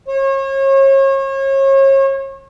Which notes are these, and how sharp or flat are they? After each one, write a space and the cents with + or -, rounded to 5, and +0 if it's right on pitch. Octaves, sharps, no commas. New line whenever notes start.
C#5 -35